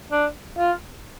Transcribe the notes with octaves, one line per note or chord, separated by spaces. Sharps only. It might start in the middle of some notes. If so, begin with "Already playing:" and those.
D4
F4